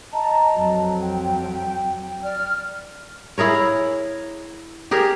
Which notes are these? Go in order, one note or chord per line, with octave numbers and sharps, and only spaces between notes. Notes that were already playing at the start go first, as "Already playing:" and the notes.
D#5 A5 A#5
F2 F#3
G5
D5 F6
E4 G#4 A#4 C#5
G4 G#4 A#4